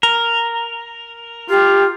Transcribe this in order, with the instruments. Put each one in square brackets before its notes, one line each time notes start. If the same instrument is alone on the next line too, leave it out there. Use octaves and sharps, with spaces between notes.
[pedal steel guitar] A#4
[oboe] F4 [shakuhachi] G4